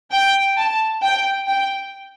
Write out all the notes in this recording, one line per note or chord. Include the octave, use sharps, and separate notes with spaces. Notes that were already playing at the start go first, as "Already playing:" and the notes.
G5
A5
G5
G5